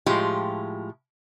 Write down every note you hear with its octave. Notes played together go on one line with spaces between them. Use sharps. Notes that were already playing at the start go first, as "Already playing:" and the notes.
A2 F3 G#3 F4 G4